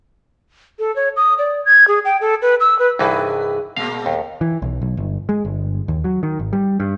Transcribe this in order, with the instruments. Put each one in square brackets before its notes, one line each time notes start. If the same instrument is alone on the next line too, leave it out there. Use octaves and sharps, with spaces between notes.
[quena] A4
C#5
D#6
D5
G#6
G#4
G5
A4
B4
E6
B4
[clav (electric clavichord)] C2 G2 E3 [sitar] D#4 G#4 B4
[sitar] A#2 G#3 A#3 [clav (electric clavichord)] F5
[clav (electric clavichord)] D#2
[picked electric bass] E3
B1
B1
G1
G#3
G1
D#2
F#3
D#3
G#1
G3
G2